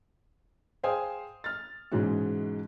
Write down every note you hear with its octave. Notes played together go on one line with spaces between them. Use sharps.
G#4 C5 F5 G5 G#5 D#6
F6 A6
G#2 B2 E3 G#3 C#4 F#4